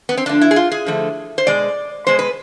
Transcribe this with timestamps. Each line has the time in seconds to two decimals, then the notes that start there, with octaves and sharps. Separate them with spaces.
0.09 B3
0.17 C4
0.26 D3 F3 A3 D4
0.41 E4
0.51 G#4
0.56 F4
0.72 G#4
0.86 D3 F3 A3
1.38 C5
1.47 B2 G#3 D5
2.07 B2 G#3 B3 C5
2.19 B4